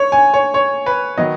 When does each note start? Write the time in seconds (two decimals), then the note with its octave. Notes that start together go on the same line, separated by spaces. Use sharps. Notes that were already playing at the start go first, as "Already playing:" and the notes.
Already playing: C#5
0.12 G#5
0.34 C#5
0.54 C#5
0.86 B4
1.17 D#3 F#3 B3 D#5